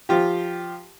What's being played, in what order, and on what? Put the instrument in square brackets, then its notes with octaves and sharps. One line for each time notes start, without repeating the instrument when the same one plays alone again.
[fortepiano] F3 F4 G4